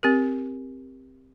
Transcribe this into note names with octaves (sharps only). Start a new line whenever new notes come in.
C4 G4 A#4